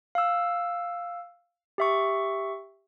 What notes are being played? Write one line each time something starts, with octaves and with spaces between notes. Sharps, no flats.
F5 E6
G4 E5 C#6